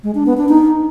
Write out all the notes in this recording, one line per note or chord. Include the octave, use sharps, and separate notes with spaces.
G#3
D4
B3
D4
D#4